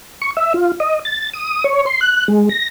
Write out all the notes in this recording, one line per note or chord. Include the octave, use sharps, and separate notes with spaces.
C#6
E5
F4
D#5
A6
D#6
C#5
C6
F#6
G#3
A#6